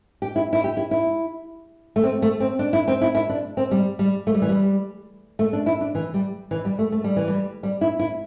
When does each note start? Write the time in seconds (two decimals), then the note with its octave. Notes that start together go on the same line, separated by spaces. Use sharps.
0.22 G4
0.36 E4
0.53 E4
0.64 G4
0.77 E4
0.91 E4
1.96 A3
2.03 C4
2.22 A3
2.40 C4
2.59 D4
2.73 E4
2.87 C4
3.01 E4
3.15 E4
3.29 D4
3.57 C4
3.71 G3
3.99 G3
4.27 A3
4.34 G3
4.42 E3
4.49 G3
5.39 A3
5.53 D4
5.66 E4
5.81 D4
5.95 E3
6.14 G3
6.51 E3
6.65 G3
6.79 A3
6.92 A3
7.04 G3
7.16 E3
7.28 G3
7.63 G3
7.81 E4
7.99 E4